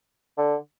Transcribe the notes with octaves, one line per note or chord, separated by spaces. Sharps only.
D3